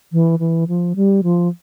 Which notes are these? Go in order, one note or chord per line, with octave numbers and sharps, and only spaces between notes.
E3
E3
F3
G3
F3